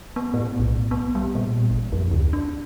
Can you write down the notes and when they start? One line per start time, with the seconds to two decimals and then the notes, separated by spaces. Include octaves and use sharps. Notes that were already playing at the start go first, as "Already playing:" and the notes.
0.16 B3
0.34 A2
0.59 B1
0.91 B3
1.15 G3
1.35 A#2
1.71 A1
1.92 F2
2.11 D2
2.33 D4